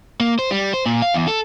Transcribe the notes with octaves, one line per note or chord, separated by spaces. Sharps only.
A#3
C5
G3
C5
A#2
F5
E2
A4